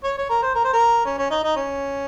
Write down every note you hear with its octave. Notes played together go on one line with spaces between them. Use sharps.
C#5
C#5
A#4
C5
A#4
C5
A#4
C#4
C#4
D#4
D#4
C#4